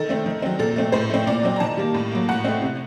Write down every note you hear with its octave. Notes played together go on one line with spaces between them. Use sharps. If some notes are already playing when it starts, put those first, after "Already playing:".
Already playing: D#3 A4
A3 C4
D#3
F#3 C4
A#2 A4
A3 C4
A2 C5
A3 C4
A#2 D5
F#3 C4
A#5
D#3 A5
G3 A#3
A2
F#3 A#3
A2 F#5
A3 C4
C3